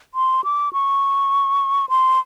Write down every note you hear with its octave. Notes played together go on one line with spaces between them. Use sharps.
C6
D6
C#6
C6